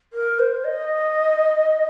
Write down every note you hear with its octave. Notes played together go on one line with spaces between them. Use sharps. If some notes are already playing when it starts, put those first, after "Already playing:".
A#4
C5
D#5